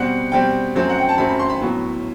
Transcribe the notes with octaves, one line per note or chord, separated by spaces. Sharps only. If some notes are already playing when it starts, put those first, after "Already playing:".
Already playing: B2 G3 C4 F#5
B2 G3 C4 G5
F#2 F#3 A3 C4
F#5
G5
A5
F#2 F#3 A3 C4 B5
B5
C6
B5
A2 F#3 B3